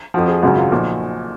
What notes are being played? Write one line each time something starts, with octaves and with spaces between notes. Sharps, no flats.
F2 F3 F#4
G#4
G#1 F#2 C#3 F#3 F#4
F4
B1 A#2 F3 F#4